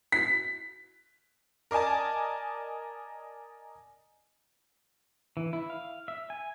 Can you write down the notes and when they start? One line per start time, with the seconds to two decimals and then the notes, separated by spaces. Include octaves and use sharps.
0.12 B6
1.71 A#4 D5 D#5 G#5 A5
5.37 E3
5.53 E4
5.70 F5
6.08 E5
6.30 G#5